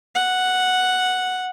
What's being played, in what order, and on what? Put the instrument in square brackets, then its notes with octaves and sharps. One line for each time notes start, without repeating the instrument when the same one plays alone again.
[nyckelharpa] F#5